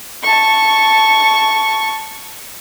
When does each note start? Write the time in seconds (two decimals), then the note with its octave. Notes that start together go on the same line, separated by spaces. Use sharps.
0.23 A5 C#6